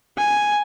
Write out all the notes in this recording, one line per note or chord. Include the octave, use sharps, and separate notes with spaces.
G#5